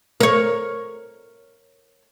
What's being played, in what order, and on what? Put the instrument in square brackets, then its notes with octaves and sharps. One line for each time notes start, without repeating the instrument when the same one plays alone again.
[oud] A#4 C#5